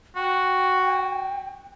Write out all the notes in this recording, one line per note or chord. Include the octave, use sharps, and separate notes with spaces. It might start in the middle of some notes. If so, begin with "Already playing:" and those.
F#4 G5